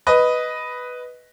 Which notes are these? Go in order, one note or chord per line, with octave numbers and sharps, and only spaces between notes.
B4 D#5